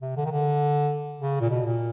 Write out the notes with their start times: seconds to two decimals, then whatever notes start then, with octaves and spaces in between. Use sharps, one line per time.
0.02 C3
0.17 D3
0.26 D#3
0.31 D3
1.21 C#3
1.41 A#2
1.50 B2
1.65 A#2